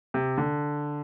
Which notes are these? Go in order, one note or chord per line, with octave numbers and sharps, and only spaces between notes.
C3
D3